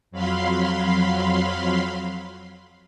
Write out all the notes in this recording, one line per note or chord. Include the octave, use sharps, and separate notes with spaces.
F2 F#3 F5 B5 C6